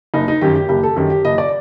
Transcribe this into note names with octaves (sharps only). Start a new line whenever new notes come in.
F#1 D#4
D#4
F#2 D#3 G4
G4
F#1 G4
A4
F#2 D#3 G4
G4
F#1 D#5
D5